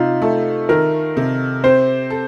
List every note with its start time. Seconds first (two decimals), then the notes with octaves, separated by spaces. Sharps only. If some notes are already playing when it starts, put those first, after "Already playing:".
Already playing: C3 D#4 F4
0.22 A3 A4
0.69 D#3 A#4
1.17 C3
1.64 C4 C5
2.10 A4